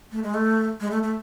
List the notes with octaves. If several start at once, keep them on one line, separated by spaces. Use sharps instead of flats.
A3
G#3
A3
G#3
A3
A3